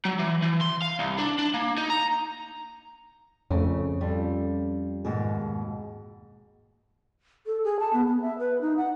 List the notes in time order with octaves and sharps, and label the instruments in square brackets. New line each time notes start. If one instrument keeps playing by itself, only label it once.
[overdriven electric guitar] F#3
E3
E3
C6
F5
C2
D4
D4
A#3
D#4
A#5
[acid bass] F2 [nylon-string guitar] C#3 A3 [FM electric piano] C#4
[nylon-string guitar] G3 F4 A4
[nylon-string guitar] D#2 G#2 B2 [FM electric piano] G#4
[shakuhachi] A4
G#4
A5
B3
B3
E5
B4
D#4
F#5